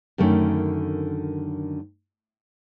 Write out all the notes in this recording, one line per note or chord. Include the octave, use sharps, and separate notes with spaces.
F#2 D3 D#3 A3 C#4